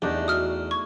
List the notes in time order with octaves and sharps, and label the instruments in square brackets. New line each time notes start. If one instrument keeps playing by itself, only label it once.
[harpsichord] E2 [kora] A3 D4 D#4 [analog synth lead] G4
[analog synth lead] F#4 [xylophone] D#6 F6
[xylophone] C#6 [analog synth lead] G#6